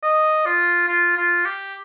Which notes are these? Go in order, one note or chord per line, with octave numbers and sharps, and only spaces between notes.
D#5
F4
F4
F4
G4